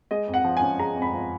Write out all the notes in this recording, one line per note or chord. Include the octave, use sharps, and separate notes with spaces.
G#3 D#5
F2
F#5
F3
C#4 G#5
G#3 A#5
F2
B5
F3